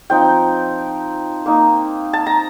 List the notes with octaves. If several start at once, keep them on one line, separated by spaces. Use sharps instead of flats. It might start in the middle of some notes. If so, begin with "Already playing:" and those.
F3 C4 D#4 G5
A#3 D#4
A5
A#5